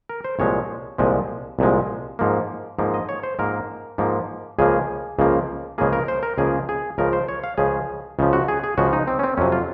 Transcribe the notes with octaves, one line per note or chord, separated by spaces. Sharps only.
A#4
C5
C2 A#2 F3 G#3 C#5
C2 A#2 F3 G#3
C2 A#2 F3 G#3
G#2 F3 A#3
G#2 F3 A#3
D#5
C#5
C5
G#2 F3 A#3 A#4
G#2 F3 A#3
C#2 C#3 F3 A#3 G#4
C#2 C#3 F3 A#3
C#2 C#3 F3 A#3 G#4
A#4
C5
A#4
C#2 C#3 F3 A#3 G#4
G#4
C#2 C#3 F3 A#4
C5
C#5
F5
C#2 C#3 F3 G#4
C#2 C#3 F3
F#4
G#4
G#4
C#2 C#3 F3 F#4
D#4
C4
C#4
C4
F2 C3 F#3 C#4
F4